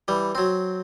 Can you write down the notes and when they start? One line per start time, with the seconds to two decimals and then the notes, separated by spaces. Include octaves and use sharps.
0.08 E3 G3
0.35 F#3 C4